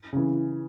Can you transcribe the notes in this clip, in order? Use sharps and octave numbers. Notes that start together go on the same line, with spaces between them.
C#3 E3